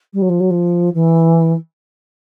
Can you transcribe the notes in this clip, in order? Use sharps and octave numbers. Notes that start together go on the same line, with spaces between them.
G3
F#3
F3
F#3
F3
E3